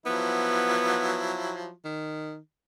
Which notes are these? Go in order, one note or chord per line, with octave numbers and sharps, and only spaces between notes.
F3 F#3 B3 E4
D#3